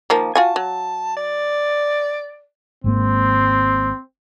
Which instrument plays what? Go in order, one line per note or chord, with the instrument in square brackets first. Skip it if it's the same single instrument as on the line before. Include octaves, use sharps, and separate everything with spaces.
[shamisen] D#3 F3 A#3
[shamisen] F4 F#4 G#5 [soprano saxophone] A5
[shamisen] F#3
[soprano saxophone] D5
[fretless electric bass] G#1 G#2 A#3 [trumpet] C4